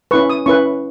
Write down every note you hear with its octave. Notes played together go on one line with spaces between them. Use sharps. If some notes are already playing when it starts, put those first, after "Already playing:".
C#4 E4 B4 C#6
D#6
C#4 E4 B4 C#6